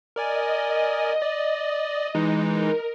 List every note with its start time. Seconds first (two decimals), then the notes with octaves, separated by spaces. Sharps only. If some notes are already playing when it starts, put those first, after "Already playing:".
0.16 A#4 D5 D#5 G#5
1.22 D5
2.15 E3 G#3 D#4
2.48 A#4